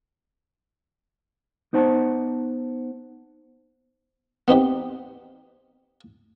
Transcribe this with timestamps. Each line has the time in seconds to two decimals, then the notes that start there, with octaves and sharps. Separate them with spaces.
1.73 B3 D#4 C5 F#5 A5
4.48 B3 C4 D#4 G4